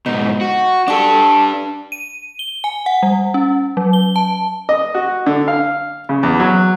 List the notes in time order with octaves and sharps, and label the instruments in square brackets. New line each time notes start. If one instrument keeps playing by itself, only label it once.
[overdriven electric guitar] G#2 B2 [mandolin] D#4
[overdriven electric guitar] F#4
[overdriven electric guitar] D4 G4 [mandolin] A4 C#6
[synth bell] D#7
G7
G#5
F#5
G3
C#4
F#3
G7
A5
[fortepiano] D#5
F#4
D3
F5
C#3
E2
F#3